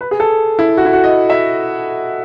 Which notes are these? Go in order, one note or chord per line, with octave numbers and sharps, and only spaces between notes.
B4
G#4
A4
E4
F#4
E4
F#4
D#5
E5